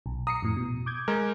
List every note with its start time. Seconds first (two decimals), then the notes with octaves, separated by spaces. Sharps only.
0.06 B1
0.27 A#5 D#6 C7 C#7
0.42 F2 A2
0.56 B2
0.86 D6 G6 G#6
1.08 G#3 A#4